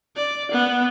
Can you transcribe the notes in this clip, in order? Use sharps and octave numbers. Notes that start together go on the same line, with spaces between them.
D5
B3